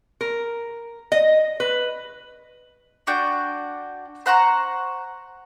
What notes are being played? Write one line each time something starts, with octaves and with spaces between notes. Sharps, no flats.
A#4
D#5
B4
D4 F#4 D5 G5
C5 F#5 A#5 C#6